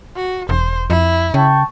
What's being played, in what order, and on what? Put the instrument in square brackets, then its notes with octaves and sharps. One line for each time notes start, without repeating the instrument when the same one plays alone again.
[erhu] F#4
[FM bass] E1 [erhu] C5
[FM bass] F2 [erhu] E4
[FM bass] C#3 [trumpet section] G5 A5 C#6